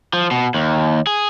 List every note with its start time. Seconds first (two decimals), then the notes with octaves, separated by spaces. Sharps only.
0.13 F3
0.31 B2
0.54 D#2
1.07 G#4